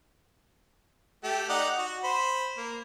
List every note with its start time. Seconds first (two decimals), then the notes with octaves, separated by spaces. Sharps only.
1.24 A3 G4
1.49 D#4 D5 F#5
1.78 F#4
2.04 C5 B5
2.57 A#3